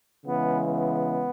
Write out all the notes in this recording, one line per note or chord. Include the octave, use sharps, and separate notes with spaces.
C#3 E3 G#3 B3
B3